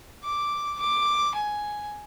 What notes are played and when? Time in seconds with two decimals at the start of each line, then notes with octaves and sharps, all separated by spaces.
0.24 D6
0.80 D6
1.35 G#5